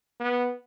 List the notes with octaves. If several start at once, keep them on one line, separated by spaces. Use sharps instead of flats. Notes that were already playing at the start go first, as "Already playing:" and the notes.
B3